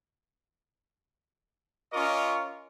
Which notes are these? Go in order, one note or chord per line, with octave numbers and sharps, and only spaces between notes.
C#4 F4 A#4 D#5 C#6 D6